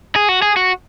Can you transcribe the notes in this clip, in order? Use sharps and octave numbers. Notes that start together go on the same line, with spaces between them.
G#4
F#4
G#4
F#4